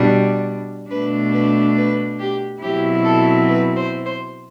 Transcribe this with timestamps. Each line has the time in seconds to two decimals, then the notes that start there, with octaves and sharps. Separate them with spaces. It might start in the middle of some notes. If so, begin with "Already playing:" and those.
Already playing: B2 G3 D4
0.90 B2 A3 D4 B4
1.33 B4
1.76 B4
2.19 G4
2.62 B2 F#3 C4 E4 G4
3.04 A4
3.48 B4
3.76 C5
4.05 C5